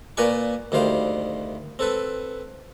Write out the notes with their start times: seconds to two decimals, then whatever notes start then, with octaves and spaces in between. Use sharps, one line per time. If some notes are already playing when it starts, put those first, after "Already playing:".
0.17 A#2 A#4 B4 D5 G#5 C#6
0.72 D2 D#3 G3 C5 F5
1.79 C4 A4 B4